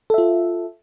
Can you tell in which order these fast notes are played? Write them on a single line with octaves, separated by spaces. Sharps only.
A4 E5 F4